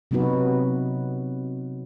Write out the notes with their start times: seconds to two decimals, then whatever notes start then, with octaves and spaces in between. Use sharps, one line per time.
0.11 C3 F#3 B3 D#4 F#4 B4